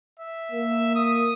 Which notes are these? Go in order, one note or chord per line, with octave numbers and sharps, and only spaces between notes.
E5
A#3
D#6